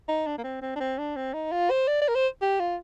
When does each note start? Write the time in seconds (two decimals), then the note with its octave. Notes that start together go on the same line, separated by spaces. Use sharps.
0.08 D#4
0.27 D4
0.38 A#3
0.44 C4
0.62 C4
0.76 D4
0.80 C4
0.98 D4
1.16 C4
1.34 D#4
1.52 F4
1.70 C5
1.88 D5
2.02 D5
2.08 A#4
2.15 C5
2.42 G4
2.60 F4